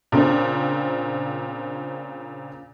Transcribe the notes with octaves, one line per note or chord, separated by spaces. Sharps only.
A#2 C#3 C4 D4